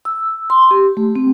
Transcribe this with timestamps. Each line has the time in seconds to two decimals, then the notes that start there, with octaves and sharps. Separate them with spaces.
0.05 E6
0.50 C6
0.71 G4
0.97 A3
1.16 C4